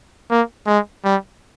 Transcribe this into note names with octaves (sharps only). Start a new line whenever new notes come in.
A#3
G#3
G3